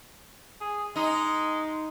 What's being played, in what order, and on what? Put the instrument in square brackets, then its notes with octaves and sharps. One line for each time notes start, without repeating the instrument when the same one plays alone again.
[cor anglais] G#4
[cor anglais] G#3 [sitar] D#4